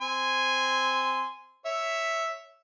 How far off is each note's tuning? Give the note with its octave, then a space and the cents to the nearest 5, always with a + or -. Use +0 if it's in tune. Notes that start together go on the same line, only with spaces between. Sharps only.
C4 +0 G#5 -5 C6 -15
C#5 +0 E5 +0